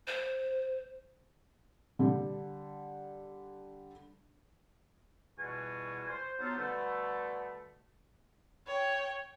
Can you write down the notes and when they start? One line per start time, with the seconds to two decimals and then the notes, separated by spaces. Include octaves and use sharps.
0.07 C5
1.99 D3 G3
5.38 E2 B2 G3 F4 F#4 G#5
6.09 C5
6.39 F#3 B3 D#4 F4 A4 C5
6.58 B2 D3 G3 A3
8.67 C#5 G5